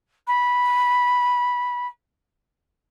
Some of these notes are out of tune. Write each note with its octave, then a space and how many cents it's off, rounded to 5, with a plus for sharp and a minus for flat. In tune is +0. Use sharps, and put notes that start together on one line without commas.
B5 -10